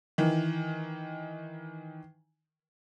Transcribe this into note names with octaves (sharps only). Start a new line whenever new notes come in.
D#3 E3